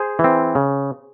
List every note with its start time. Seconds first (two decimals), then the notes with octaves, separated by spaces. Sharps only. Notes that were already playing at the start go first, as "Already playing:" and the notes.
Already playing: G#4 C5
0.19 E3
0.24 C4
0.55 C#3